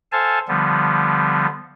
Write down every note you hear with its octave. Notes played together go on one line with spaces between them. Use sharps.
A4 C5 F5 G#5 A5
D3 F3 G3 B3